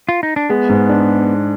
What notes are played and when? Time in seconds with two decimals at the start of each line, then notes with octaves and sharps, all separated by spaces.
0.09 F4
0.23 D#4
0.36 D4
0.49 G#3 B3
0.69 G#2
0.89 D4